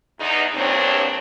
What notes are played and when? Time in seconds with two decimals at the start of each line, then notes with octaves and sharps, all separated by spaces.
0.19 E2 D#4
0.55 E2 G2 A#2 C4 D4 C#5